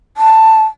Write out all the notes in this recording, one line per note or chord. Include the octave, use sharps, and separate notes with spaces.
A5